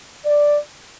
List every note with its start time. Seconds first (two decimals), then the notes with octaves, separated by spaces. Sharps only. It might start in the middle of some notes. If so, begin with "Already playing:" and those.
0.25 D5